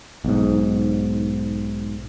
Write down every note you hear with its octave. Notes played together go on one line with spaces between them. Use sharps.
B1 G#2